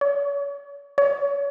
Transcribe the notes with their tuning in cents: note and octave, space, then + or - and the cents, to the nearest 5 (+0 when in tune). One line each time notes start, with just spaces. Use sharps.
C#5 +40
C#5 +30